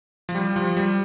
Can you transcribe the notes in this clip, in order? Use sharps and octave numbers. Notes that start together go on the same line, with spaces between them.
F3
G3
F3
G3